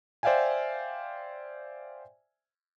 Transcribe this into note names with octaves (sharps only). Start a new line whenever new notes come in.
C5 D5 E5 F5 G5 G#5